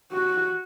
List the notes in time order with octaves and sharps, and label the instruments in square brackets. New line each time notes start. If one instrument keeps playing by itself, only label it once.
[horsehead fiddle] F#4